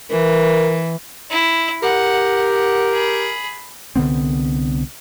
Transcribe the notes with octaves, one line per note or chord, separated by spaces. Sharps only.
E3 A#4
E4
G4 A#4 F#5
F#5
G#4 B5
C2 D3 B3 C4